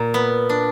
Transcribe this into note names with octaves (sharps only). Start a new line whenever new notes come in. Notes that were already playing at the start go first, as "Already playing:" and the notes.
Already playing: A#2
B3
D4